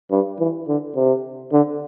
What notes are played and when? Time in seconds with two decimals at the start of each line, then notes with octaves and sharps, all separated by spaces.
0.11 G2
0.39 E3
0.68 D3
0.96 C3
1.52 D3